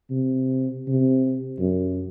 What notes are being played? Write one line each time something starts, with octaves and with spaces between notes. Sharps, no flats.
C3
C3
F#2